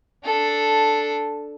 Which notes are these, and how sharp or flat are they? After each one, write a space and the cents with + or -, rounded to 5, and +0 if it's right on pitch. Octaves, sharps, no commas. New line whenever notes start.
D4 +0 A4 +0